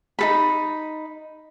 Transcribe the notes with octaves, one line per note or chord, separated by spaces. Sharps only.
D#4 A4 B5